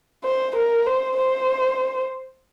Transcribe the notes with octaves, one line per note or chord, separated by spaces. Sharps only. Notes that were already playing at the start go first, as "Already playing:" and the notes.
C5
A#4
C5
C5